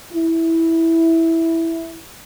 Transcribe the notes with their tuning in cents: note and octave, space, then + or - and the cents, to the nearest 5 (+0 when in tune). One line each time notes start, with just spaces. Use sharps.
E4 -5